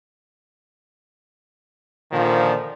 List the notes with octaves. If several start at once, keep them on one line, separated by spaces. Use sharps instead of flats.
A#2 D3 D#3 F3